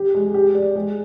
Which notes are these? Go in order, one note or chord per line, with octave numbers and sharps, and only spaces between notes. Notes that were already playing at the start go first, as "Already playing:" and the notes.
Already playing: G4
G#3
G4
D5
G#3